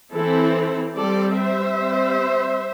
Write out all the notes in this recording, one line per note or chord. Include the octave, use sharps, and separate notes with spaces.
E3 C4 E4 A4
G3 C4 A4 D5
C5 E5
G3 C4